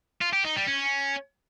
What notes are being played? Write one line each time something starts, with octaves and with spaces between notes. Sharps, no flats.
F4
G4
D#4
G3
C#4